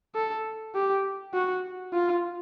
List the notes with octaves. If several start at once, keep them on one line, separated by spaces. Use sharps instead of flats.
A4
G4
F#4
F4